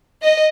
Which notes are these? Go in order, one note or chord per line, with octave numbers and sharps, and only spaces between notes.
D#5